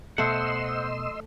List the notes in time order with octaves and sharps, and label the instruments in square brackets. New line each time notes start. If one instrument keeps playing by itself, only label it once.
[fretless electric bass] B2 B3 [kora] A3 [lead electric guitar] C5 F#5 [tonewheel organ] D#5 C6 E6